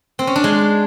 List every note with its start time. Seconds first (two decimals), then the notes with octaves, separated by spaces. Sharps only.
0.19 C4
0.27 C#4
0.36 D4
0.44 G#3